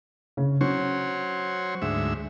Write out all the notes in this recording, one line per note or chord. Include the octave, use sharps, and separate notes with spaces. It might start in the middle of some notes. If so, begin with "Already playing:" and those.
C#3
F#3 C#4 C5 C#5
D2 G#2 E5